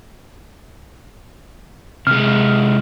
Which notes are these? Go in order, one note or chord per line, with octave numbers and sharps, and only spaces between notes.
C3 G#3 F6